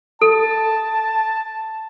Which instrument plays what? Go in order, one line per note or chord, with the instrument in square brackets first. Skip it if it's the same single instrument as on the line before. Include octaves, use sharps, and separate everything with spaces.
[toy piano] A4 [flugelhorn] A5